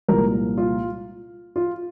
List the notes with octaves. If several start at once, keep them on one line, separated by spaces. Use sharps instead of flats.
C2 A#2 F3 A#4
F4
F4